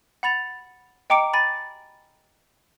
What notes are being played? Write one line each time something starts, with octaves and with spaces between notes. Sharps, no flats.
F#5 B5 A6 F7
D#5 G5 A#5 D6 C#7 D7
G#5 B5 A6 D#7